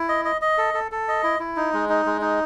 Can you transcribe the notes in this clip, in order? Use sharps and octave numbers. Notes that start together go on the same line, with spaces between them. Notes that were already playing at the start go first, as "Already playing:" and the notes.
Already playing: E4
D#5
D#5
D#5
A4
A4
A4
D#5
E4
E4
D#4
G#3
D#4
G#3
D#4